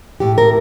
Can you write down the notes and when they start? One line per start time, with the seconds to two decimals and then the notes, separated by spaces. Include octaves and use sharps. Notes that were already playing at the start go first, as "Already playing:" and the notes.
0.20 A2 G4
0.38 A#4